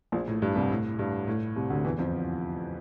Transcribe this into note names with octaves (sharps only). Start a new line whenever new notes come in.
A#1 A#2
A2
G2
C2 C3
A2
G2
A2
C2 C3
D2 D3
E2 E3
F2 F3